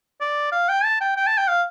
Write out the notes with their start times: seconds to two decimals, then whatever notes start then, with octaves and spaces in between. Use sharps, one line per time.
0.21 D5
0.52 F5
0.69 G5
0.85 A5
1.01 G5
1.16 G5
1.27 A5
1.38 G5
1.48 F5